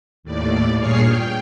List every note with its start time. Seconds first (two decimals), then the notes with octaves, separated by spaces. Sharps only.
0.23 D#2 A2 D5
0.77 G2 A#2 G#4 C#5 F6 C7
1.07 G5